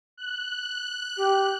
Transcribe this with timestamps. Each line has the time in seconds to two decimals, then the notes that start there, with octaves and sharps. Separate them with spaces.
0.17 F#6
1.17 G4